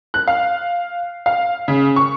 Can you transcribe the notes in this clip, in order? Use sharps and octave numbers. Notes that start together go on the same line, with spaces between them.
F#6
F5
F5
C#3
C#6